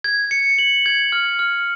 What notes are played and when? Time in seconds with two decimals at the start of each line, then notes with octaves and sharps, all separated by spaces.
0.04 G#6
0.31 C#7
0.58 F#7
0.86 G#6
1.12 F6
1.39 F6